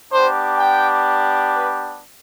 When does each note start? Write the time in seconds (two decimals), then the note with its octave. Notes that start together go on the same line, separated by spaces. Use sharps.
0.12 B3 D4 G4 C5
0.59 G5
1.54 B4